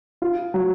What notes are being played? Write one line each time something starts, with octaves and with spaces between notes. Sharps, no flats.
F4
F#3